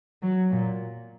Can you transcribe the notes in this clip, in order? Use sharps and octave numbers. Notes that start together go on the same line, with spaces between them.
F#3
A#2